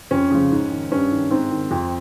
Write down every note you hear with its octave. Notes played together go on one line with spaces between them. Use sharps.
F2 C#4
C#3 F3
G#2
D#3
G2 C#4
D#3
G#2 C4
D#3
F2